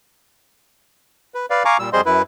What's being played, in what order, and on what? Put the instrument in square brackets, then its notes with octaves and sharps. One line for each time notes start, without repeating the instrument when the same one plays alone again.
[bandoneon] B4
B4 D5 F5
F5 G#5 A#5 C#6 D6
A#2 G3 E6
F2 G3 G#4 C5 D#5 C6
F#2 E4 B4